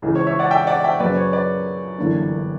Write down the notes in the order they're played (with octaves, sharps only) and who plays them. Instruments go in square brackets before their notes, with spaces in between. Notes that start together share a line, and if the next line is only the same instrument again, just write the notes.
[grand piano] C#2 C#3 E3
[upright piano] C#5
C#5 E5
D5 F#5
E5 G5
D5 F#5
E5 G5
[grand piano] F#2 C#3 F#3 C#4 [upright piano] B4 D5
[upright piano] C#5
B4 D5
[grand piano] G1 F#2 E3 A#3 D4